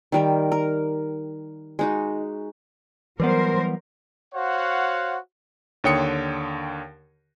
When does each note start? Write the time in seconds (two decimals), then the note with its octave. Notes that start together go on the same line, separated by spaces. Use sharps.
0.12 D#3 G3 A#4
0.52 A#4
1.79 G#3 D#4 F#4
3.20 E3 F#3 G3 B3 A#4 C5
4.35 F#4 C5 C#5 F5 F#5
5.84 D#2 D3 C#5 G5 D#6 C#7